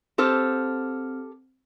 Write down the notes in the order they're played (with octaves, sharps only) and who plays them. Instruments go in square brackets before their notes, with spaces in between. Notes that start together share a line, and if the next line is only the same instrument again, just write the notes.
[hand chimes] C4 F6 [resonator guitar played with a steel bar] G4 A4 C5